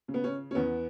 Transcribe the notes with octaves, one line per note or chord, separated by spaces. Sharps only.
C#3
B3
C#4
C#4
E2 B3